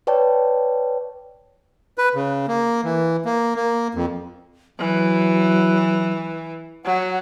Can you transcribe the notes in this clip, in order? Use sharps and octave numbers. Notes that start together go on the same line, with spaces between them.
B4 C#5 D5 G5 A5
B4
C#3
A#3
E3
A#3
A#3
F2
E3 F#3
F#3 F#5